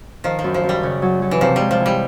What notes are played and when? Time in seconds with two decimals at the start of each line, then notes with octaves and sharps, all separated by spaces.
0.24 D#3 F3
0.39 F3
0.44 F#2
0.54 F3
0.64 F#2
0.69 G3
0.83 C#3
1.02 F#3
1.22 F#3
1.31 E3
1.41 C3 F3
1.56 G3 G#3
1.71 F3
1.81 E3
1.86 G3